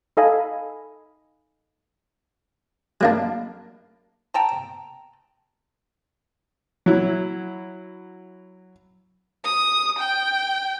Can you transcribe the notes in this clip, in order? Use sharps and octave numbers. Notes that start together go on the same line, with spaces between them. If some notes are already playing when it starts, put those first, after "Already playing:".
D#4 A4 D#5 F5 G#5 B5
F#3 A#3 D4
G5 A5 A#5
F#3 E4
D#6
G5